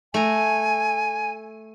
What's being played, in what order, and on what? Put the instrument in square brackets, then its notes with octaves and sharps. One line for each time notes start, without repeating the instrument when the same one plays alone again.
[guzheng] A3 A#5 [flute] G#5